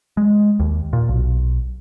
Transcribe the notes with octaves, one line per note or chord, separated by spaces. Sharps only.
G#3
D#2
A#2
B1